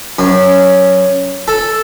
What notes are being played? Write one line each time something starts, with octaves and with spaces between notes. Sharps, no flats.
F#2
A4